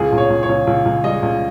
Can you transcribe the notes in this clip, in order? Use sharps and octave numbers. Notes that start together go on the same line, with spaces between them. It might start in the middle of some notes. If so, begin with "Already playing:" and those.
Already playing: C#2 G#4
C#2
C#5
C#2
C#5
C#2
C#2
C#2
G3 D#5
C#2